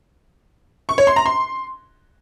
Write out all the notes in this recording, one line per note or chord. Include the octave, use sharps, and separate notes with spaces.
C#6
C#5
C6
A#5
C6